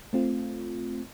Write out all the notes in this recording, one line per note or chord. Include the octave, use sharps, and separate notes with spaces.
A3 C4 F4